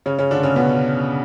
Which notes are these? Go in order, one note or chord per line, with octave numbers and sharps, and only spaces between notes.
C#3 C#4
C#3 C#4
D3 D4
C#3 C#4
B2 B3